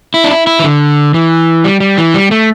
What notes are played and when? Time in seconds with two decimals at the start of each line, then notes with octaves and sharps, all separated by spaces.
0.14 E4
0.24 D4
0.31 E4
0.47 E4
0.60 E3
0.64 D3
1.14 E3
1.64 G3
1.80 G3
1.98 E3
2.14 G3
2.31 A3